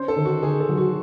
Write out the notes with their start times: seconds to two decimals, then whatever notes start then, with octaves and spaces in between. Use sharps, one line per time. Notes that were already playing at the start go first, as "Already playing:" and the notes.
Already playing: C#4 C5
0.08 A4
0.16 D#3
0.25 F#4
0.42 D#3 G#4
0.60 A4
0.69 F#3
0.77 F#4